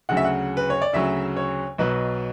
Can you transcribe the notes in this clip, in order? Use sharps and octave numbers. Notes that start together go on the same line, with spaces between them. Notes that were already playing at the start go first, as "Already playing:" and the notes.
D2 C#3 F#3 F#5
E5
F#5
B4
C#5
D5
D2 C#3 F#3 E5
C#5
B1 B2 F#3 B4